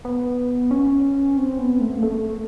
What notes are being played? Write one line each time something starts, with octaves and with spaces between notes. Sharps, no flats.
B3
C#4
C4
B3
A3
A#3
A3